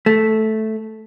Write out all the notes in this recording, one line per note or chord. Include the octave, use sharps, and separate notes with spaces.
A3